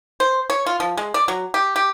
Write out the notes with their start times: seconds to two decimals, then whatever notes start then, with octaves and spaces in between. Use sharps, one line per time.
0.20 C5
0.50 C#5
0.66 F4
0.80 F3
0.97 G#3
1.14 D5
1.28 F#3
1.54 G4
1.76 G4